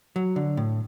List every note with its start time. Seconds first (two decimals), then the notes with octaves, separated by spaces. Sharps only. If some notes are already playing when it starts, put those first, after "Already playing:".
0.16 F#3
0.36 D3
0.57 A2